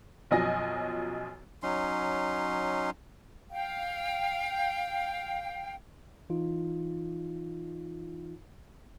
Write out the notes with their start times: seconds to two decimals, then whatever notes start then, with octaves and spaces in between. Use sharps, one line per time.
0.31 B1 F#2 F3 D#5 G#5 A#6
1.63 F#3 C#4 D#4 C6
3.51 F5 G5
6.30 E3 D#4 F4